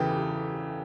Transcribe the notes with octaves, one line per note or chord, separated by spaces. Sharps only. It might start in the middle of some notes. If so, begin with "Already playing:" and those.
Already playing: E2 C#3 E3 G4 A4 B4